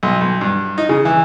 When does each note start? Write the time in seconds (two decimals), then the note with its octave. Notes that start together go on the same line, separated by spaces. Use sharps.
0.03 B1
0.21 B1
0.41 G2
0.78 D#4
0.89 C#3
1.05 E3